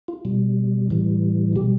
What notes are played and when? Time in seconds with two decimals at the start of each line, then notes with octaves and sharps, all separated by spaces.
0.08 F4
0.25 B2 G3
0.90 A2 E3 G3
1.56 B2 G3 G4